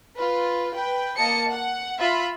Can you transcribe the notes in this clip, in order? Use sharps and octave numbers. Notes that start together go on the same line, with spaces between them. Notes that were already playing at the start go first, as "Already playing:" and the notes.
F4 B4
B4 G5
A#3 D#5 A5 C#7
F#5
F4 E5 B5